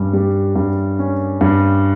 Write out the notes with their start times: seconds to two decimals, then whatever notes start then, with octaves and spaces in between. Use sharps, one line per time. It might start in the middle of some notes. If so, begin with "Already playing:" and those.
Already playing: G2 C#4
0.13 G3
0.56 G2
0.99 C#4
1.41 G2